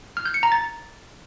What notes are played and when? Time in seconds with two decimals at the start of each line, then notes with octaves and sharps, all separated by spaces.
0.17 F6
0.26 G6
0.34 C#7
0.43 A#5
0.52 A6